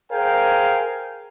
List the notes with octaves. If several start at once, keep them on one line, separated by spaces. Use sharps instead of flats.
G#4 A#4 C5 F5 G5 G#5